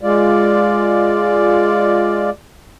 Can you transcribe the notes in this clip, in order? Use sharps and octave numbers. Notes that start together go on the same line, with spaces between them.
G#3 F4 D5